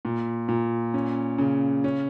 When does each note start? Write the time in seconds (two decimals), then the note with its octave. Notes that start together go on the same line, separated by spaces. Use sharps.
0.05 A#2
0.48 A#2
0.94 C#4
1.38 C#3
1.84 C#4